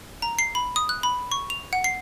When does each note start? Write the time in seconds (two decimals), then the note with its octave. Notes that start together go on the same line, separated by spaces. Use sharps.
0.22 A#5
0.39 C7
0.55 B5
0.76 D#6
0.89 F#6
1.03 B5
1.32 C#6
1.50 F7
1.73 F#5
1.84 C7